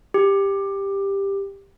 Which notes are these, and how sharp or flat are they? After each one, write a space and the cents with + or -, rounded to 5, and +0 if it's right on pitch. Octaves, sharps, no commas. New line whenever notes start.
G4 +10